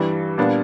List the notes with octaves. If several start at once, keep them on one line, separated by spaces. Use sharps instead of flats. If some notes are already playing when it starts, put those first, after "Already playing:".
Already playing: G2 E3 G3
A#2 G3 B3 D4